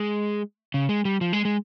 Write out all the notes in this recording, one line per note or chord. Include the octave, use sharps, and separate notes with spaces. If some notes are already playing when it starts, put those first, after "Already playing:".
Already playing: G#3
C#3
G#3
G3
F3
G#3
G#3